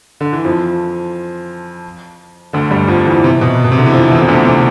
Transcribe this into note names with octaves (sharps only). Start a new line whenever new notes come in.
D3
E3
F2 F3
D2 D3
G2 G3
F2 F3
E2 E3
C3
B2
B2
C3
D3
E3
F2 F3
E2 E3
C3
D2 D3
C3